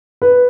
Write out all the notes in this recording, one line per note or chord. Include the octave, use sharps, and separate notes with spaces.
B4